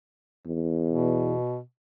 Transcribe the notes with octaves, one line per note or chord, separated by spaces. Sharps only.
E2
B2